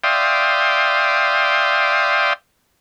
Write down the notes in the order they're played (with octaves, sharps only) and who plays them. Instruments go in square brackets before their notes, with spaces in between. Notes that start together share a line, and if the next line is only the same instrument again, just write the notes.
[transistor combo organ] D5 E5 F5 G5 C6 D#6